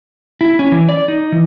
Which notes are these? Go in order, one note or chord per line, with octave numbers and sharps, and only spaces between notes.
E4
C#4
E3
D5
D#4
E3